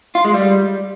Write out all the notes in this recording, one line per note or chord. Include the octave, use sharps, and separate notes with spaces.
F4
G#3
G3